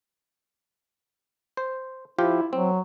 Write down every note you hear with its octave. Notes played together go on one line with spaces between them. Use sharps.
C5
F3 E4 F4 G4
F#3 C4